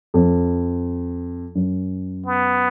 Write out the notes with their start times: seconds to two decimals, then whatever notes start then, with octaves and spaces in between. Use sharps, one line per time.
0.14 F2
1.55 F#2
2.26 B3